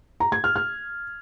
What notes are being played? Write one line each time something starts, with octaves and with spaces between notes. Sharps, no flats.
A#5
G#6
F6
F6